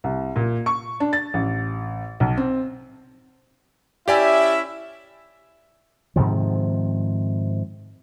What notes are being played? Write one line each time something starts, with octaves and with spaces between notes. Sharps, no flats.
C2
A#2
C#6
D4
A6
A1
B1
C4
C#4 E4 G4 D5 E5 G#5
G#2 C3 D#3 F3